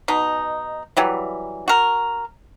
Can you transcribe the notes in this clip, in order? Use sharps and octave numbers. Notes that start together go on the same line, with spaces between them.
B2 D#4
E3 F#3 G3
F#4 A#4